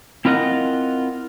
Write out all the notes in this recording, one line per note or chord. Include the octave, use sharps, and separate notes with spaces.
C4 E4 F4 A#4 D#5 F#5